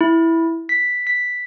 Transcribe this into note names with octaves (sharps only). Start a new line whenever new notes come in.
E4
B6
B6